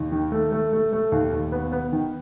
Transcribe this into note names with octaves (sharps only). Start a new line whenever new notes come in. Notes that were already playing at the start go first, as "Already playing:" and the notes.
Already playing: D#2
D#3
A3
A3
A3
A3
D#2
D#2
B3
B3
D#3